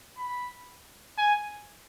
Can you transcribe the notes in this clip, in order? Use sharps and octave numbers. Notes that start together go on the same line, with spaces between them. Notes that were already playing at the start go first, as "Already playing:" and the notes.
B5
G#5